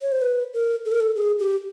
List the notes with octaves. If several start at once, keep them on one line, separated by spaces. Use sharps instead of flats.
C#5
C5
B4
A#4
A4
A#4
A4
G#4
G4